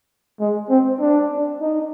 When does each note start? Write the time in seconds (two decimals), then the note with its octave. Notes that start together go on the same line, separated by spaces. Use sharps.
0.40 G#3
0.70 C4
1.00 D4
1.61 D#4